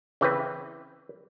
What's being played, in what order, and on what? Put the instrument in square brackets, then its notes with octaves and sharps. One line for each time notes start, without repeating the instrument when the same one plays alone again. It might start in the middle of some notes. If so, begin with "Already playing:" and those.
[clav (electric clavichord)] C#3 E3 C4 B4